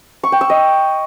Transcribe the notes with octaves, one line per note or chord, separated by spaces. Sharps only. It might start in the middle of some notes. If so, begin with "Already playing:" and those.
C#6
G5
E6
D#5